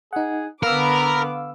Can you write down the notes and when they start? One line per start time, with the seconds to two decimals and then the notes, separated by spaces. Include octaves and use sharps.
0.13 D#4 G#4 F#5
0.63 D3 B3 A#4 F5 B5 D6 E6